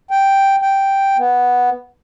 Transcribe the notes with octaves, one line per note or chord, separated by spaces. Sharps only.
G5
G5
B3